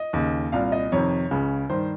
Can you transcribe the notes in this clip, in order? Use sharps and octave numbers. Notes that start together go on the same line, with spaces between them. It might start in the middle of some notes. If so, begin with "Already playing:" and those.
Already playing: D#5
D#2 C#3
C2 A#2 F5
D#5
F2 C3 D#3 C#5
C#2 C#3
G2 D#3 C5